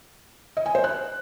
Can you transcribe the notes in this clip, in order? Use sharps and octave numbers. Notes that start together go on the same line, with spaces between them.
D#5
G#5
C5
F#6